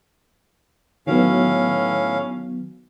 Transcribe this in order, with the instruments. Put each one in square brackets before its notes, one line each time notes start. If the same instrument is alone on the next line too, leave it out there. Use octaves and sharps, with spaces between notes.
[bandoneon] A2 C#4 F5 [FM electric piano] D#3 F#3 B3